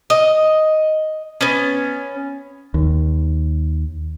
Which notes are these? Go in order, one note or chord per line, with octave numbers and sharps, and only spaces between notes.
D#5
B3 C#4
D#2